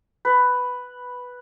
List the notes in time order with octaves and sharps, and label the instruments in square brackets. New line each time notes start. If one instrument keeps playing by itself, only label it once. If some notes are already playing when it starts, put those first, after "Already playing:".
[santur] B4